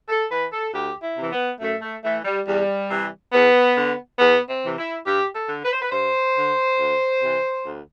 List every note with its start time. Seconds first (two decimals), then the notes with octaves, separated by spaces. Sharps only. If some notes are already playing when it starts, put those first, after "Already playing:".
0.09 A4
0.31 E3 B4
0.53 A4
0.74 D2 G4
1.03 E4
1.18 C3 E3
1.32 B3
1.61 F#2 A3
1.82 A3
2.04 E3 A3
2.25 G3
2.46 E2 G3
2.90 C3 E3
3.33 E2 B3
3.76 D3
4.19 E2 B3
4.49 C4
4.63 C3 E3
4.77 E4
5.05 G2 G4
5.35 A4
5.49 D3
5.64 B4
5.73 C5
5.82 B4
5.92 G2 C5
6.36 D3
6.79 D2
7.22 C3 E3
7.66 D2